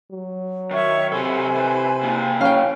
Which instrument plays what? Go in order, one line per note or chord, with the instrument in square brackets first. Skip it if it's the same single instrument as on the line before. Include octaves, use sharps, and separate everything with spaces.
[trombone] F#3
[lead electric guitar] D#3 [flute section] C#5 E5 C#6
[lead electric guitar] B1 A4 [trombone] C3 [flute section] C5 G#5 B5
[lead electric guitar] E3
C#3 A#3
[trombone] C#4 [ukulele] F5 G5